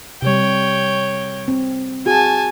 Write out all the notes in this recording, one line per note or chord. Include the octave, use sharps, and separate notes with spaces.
C3 G3 C#5 G5
C4
F#4 G#4 G#5 A5